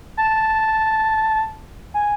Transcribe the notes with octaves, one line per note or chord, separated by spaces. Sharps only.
A5
G#5